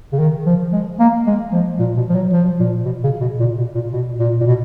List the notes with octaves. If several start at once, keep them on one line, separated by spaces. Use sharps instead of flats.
C#3
D#3
F3
G#3
A#3
G#3
F3
A#2
B2
F3
F#3
F3
A#2
B2
C#3
B2
A#2
B2
A#2
B2
A#2
A#2
B2